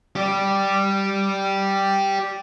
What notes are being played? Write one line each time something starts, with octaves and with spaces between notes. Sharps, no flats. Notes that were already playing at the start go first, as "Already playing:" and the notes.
G4 D5